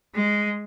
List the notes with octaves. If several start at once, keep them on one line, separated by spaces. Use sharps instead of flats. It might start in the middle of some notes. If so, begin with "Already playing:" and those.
G#3